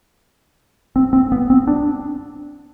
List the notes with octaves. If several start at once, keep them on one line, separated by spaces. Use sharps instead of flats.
C4
C4
B3
C4
D4